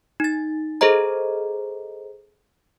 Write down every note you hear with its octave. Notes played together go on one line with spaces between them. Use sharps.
D#4 A6
G#4 A4 C5 D#5 A#5